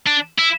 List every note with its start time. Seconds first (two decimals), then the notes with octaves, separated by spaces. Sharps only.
0.07 D4
0.39 E4